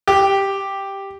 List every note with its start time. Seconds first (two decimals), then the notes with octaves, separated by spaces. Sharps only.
0.08 G4